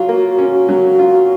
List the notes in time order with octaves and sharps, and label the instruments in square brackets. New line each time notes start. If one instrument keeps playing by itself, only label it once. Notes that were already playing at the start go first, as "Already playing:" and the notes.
Already playing: [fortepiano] F#3 F4 [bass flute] F#4
[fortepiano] A#3
C#4
F#3
F4